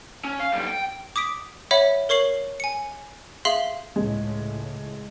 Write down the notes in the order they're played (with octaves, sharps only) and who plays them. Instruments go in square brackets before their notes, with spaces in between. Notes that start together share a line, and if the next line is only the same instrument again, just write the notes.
[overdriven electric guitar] C#4
F5
B1 G3
G5
[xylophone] D6 D#6 B6 D7
C#5 E5 F#5 B5
A#4 C#5 C#6 C7 F#7
G#5 C#7
G#4 E5 F5 C6 F#7
[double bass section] C#2 A2 [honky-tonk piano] G#3